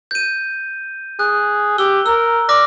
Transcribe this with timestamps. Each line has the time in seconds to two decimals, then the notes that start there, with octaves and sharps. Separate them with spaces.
0.11 G6 D#7
1.19 G#4 F#6
1.78 G4 E6 G7
2.06 A#4 E6
2.49 D5 D6 F6 A#6